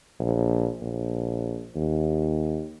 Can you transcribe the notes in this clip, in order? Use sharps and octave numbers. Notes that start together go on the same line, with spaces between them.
A#1
A#1
D#2